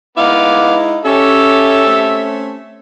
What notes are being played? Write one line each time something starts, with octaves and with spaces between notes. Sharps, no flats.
G#3 B3 D#4 E4 F5 D6
C#4 G4 A4 E5
A3 C4 C#4